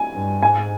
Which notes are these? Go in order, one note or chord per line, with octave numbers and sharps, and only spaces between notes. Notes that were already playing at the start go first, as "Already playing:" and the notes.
Already playing: G#5
G2
G#2 G#5